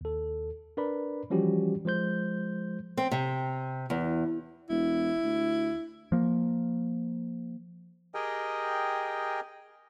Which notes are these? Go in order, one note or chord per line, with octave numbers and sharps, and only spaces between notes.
D#2 A4
D4 A#4 B4 D5 B5
E3 F3 G3 C#4 F#4 G4
F3 G#3 C5 G6
C4
C3
E2
E1 E4
D2
F3 A#3
G4 G#4 A#4 D#5 G5